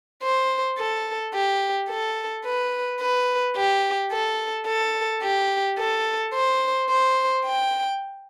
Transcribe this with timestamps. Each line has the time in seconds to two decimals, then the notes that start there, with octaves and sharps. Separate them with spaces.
0.23 C5
0.78 A4
1.34 G4
1.90 A4
2.45 B4
3.01 B4
3.57 G4
4.12 A4
4.68 A4
5.23 G4
5.79 A4
6.34 C5
6.90 C5
7.45 G5